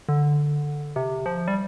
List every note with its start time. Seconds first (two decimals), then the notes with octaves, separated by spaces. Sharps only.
0.09 D3
0.96 C3
1.26 F3
1.48 G3